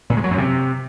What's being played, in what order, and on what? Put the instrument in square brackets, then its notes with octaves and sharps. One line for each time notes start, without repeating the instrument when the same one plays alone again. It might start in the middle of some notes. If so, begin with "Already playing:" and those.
[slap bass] A#2
G#3
F#3
F#2
C3